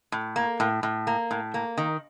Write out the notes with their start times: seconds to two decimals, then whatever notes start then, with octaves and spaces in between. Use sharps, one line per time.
0.12 A2
0.36 A#3
0.60 A2
0.83 A2
1.07 A#3
1.31 A2
1.54 A#3
1.77 D#3